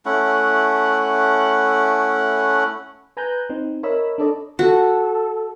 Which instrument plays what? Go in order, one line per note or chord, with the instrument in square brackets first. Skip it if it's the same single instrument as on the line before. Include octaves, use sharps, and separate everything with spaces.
[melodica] A3 C#4 E4 F#5
[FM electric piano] B4 G#5 A#5 F#6 G6
C4 D#4
A#4 C#5 D#5 E5 B5 E6
D4 A4 D5 D#5
[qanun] F#4 [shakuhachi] A4